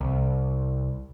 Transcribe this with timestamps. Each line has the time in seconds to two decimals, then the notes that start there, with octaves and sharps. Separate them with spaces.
0.01 C2